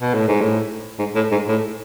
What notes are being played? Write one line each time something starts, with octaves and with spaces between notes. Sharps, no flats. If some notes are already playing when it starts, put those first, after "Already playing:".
B2
A2
G#2
A2
G#2
A2
G#2
A2